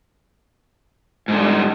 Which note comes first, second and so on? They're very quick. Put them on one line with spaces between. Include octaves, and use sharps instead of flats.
G#2 D3 G3